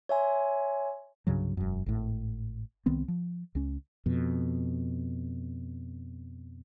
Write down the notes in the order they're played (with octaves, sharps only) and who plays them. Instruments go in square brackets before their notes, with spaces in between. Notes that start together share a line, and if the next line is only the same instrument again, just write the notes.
[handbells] C#5 E5 G#5 C6
[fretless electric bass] C2 G2 C#3 F#3
E1 F#2
G#1 A2
C2 D#3 B3 C4
F3
C#2 C#4
F2 B2